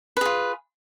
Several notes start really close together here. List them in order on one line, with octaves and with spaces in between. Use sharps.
B4 G#4 F4